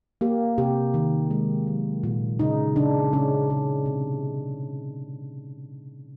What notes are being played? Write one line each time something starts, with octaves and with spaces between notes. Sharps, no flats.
A#3 G4
C3 G4
D#3
G#3
F#3
A#2
C#3 D#4
C#3 D4
C#3 C#4
C#3
C3